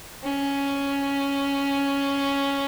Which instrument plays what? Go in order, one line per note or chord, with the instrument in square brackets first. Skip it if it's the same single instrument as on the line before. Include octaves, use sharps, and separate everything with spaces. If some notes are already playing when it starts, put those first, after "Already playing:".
[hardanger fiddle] C#4